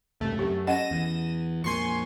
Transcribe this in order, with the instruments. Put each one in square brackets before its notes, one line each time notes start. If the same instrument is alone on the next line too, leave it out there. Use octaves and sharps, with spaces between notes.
[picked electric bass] C#2 G2 C3 [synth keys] A3
[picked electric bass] F#2 [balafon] G4 A4
[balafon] C#4 D#5 F#5 [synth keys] A#6 D#7 E7
[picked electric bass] E2
[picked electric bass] F2 A#2 [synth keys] G#5 C6 C#6